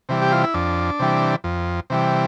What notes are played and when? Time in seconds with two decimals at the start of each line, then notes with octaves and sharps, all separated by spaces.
0.09 C3 E3 G3
0.22 G4
0.32 F4
0.44 E4
0.54 F2 D4
0.99 C3 E3 G3
1.44 F2
1.90 C3 E3 G3